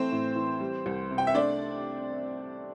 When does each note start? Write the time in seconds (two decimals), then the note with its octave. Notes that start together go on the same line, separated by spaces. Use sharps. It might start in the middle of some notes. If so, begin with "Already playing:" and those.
Already playing: E3 A3 C4 C5
0.11 A2
0.36 E3
0.60 G3
0.86 C2
1.11 C3
1.18 G5
1.27 E5
1.35 A3 D4 D5